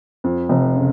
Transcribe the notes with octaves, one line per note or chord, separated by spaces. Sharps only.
F2
F1
C#3